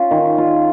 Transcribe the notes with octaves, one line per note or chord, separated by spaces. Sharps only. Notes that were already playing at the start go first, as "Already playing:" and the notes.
Already playing: C#4 F4
D#3
F4